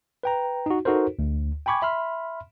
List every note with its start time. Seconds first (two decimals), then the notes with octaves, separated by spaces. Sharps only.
0.23 B4 G5 A#5
0.66 D#4 F#4
0.85 D#4 F#4 A4 A#4 C5
1.19 D2
1.66 G5 G#5 B5 C#6 D6 G#6
1.82 E5 B5 C6 F6